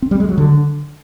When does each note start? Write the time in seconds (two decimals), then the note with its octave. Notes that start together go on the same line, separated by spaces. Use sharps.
0.02 C4
0.11 G3
0.20 G#3
0.29 F#3
0.37 D3